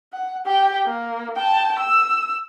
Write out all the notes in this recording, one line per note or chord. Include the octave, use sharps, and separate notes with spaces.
F#5
G4 G5
A#3
G5 A5
E6